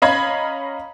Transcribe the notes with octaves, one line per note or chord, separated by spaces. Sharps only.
C#4 D#5 F5 A#5 B5 G#6